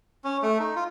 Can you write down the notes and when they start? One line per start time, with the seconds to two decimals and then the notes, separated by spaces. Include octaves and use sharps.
0.25 C#4
0.42 A3
0.59 D#4
0.76 F4